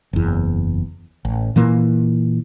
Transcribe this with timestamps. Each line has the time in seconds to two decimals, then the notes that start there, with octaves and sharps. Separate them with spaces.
0.13 F#1 E2
1.25 A1
1.56 A#2 E3 A#3